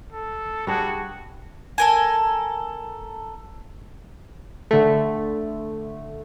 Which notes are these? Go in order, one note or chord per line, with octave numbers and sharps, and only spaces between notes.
A4
G3 D4 F#4 G#4
A4 A#4 G#5
D3 A3